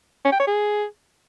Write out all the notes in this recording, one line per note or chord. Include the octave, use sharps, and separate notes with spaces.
C#4
G5
C#5
G#4